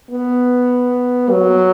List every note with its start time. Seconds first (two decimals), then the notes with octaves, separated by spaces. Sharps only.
0.11 B3
1.31 F#3